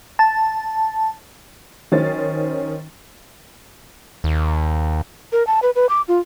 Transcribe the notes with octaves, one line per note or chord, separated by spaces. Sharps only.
A5
D#3 F#3 C#4 C5 A6
D#2
A#4
A5
B4
B4
D6
F4